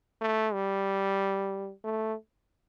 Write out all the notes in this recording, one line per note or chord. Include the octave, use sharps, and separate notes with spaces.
A3
G3
A3